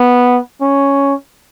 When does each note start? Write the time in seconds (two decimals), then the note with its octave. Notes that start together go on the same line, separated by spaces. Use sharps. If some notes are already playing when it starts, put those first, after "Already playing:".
Already playing: B3
0.61 C#4